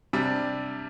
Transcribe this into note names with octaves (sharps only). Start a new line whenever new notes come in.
C3 G3 D4